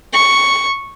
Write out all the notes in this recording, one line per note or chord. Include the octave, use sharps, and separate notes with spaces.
C#6